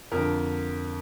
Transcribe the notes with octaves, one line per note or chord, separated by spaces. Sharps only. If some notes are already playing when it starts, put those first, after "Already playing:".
F2 D3 A#4